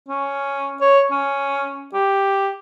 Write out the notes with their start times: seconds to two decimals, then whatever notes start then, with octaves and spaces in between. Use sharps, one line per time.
0.09 C#4
0.81 C#5
1.11 C#4
1.94 G4